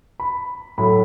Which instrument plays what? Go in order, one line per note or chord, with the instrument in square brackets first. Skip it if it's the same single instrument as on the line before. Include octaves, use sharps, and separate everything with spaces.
[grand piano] B5
A2 F#3 A3 B5